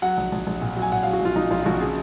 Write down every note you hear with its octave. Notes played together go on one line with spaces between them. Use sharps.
F#3 F#5
A#1
A#1
A#1
A#2
F#3
G#5
A#2 F#5
F5
F#3
F#4
A#1 F4
A#1 D#4
A#1 F4
A#1 F#4
C#3 G#4